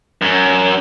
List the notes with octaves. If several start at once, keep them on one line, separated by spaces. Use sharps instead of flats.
F#2